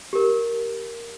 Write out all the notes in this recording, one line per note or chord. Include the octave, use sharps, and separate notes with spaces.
G4 A#4